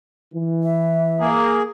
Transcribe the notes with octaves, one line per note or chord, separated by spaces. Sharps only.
E3
E5
A#3 G#4